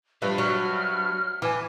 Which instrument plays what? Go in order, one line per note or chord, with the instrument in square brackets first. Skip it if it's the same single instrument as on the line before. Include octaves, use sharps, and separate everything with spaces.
[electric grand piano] G2 B4 E5 [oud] F3 [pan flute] G4
[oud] F#3 [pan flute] F6
[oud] E3 [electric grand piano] G#5 D6